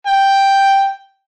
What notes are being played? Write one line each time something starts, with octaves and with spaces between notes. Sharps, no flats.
G5